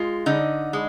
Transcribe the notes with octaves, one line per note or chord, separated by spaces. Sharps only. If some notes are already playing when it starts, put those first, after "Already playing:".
Already playing: G#3 F4
D3 D#4
G#3